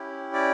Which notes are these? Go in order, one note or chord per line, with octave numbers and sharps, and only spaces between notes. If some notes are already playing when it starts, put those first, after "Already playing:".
Already playing: C#4 E4 G4
D5